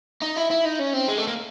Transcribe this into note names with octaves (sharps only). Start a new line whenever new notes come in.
D#4
E4
E4
D#4
C#4
C4
G#3
A3
A#3